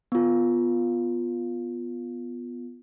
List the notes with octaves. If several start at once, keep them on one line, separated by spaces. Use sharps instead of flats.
B3 F4